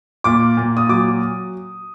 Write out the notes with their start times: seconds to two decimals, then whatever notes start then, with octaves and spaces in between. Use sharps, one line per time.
0.24 A#2 D6
0.57 A#2
0.77 D#6
0.89 F#3 D6